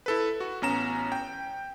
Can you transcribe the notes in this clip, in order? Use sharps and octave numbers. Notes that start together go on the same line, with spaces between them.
E4 A4 B4
F#4
A1 B3 C#4 A#5 E7
G5